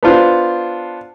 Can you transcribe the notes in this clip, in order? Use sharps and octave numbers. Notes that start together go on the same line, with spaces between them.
B3 D4 F4 C5